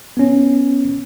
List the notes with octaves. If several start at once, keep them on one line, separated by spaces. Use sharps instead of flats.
B3 C#4